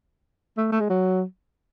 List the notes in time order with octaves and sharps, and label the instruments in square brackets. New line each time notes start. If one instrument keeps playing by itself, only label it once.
[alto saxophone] A3
A3
G#3
F#3